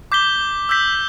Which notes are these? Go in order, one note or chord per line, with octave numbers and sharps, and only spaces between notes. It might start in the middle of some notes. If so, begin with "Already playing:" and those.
D6 G6 B6 G7
E6 G6 B6